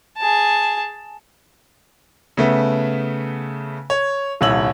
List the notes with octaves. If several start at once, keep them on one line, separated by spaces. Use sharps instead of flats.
G#4 A5
C#3 A3 B3
C#5
D#1 C2 C#5 E6 F#7